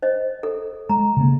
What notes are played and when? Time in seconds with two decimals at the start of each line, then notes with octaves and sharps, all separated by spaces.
0.02 C5 D#5
0.43 A4
0.89 G#3 A#5
1.17 C#3 A#3